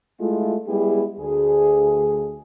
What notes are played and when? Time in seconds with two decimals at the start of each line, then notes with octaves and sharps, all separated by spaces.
0.20 G#3 A3 E4 F4
0.67 G3 G#3 B3 E4 G4 G#4
1.20 D2 G#4